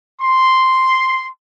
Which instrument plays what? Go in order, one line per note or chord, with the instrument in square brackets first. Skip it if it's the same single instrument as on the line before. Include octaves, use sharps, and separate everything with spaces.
[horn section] C6